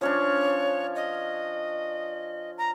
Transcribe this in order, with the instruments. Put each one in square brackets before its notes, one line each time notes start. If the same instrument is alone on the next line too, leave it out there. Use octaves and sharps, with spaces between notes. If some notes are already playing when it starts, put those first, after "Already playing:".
[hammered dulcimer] F3 C#4 D4 [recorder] C#5
[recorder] D#5
A#5